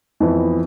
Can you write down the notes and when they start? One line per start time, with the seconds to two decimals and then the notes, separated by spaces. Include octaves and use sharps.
0.20 F2 E3 B3 E4